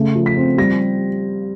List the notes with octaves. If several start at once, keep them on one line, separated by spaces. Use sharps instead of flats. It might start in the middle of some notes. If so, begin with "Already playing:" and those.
Already playing: C#3 A3
F3
B6
C4
G3 A#6